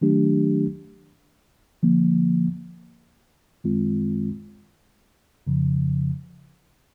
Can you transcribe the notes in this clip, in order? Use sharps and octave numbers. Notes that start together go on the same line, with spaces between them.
D#3 F#3 A3 D4 G4
D3 F3 A#3
F#2 D#3 G#3 C4 F4
F2 C#3 F3